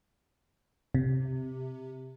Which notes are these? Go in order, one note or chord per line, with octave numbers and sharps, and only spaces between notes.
C3